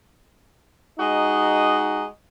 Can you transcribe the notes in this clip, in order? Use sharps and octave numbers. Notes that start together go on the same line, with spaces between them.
G#3 D#4 F#4 D#5 A#5